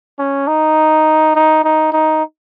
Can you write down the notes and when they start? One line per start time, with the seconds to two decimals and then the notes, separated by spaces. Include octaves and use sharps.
0.19 C#4
0.48 D#4
1.35 D#4
1.64 D#4
1.93 D#4